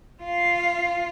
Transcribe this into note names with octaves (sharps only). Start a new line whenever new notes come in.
F4 F5